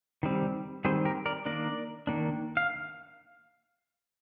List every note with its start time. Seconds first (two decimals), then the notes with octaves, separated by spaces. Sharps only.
0.23 D#3 G3 C4
0.85 D#3 G3 C4 G#4 C5
1.05 G4 A#4
1.26 A#4 D5
1.46 D#3 A#3 D4 A#4 D5
2.07 D#3 A#3 D4
2.57 F5